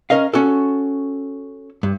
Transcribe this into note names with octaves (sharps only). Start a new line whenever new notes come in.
C#4 A#4 D#5 F5
C#4 F#4 A4
G2